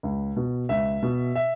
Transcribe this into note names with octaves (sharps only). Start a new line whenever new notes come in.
C#2
B2
C#2 E5
B2
E5